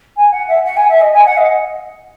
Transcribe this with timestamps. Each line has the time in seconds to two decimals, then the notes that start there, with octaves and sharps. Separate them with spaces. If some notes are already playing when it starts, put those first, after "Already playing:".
0.17 G#5
0.32 F#5
0.48 E5
0.65 F#5
0.77 G#5
0.89 E5
1.01 D#5
1.13 G#5
1.25 F#5
1.37 D#5